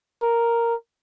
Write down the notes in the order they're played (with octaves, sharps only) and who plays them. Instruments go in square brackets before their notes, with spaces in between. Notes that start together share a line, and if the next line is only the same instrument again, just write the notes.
[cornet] A#4